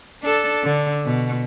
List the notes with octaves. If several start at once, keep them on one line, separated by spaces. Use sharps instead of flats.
D4 A4
D3
B2